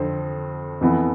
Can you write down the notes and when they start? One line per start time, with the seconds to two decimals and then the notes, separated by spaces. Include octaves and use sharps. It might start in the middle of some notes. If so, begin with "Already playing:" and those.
Already playing: F2 D3 F3 C4
0.81 F2 E3 B3 E4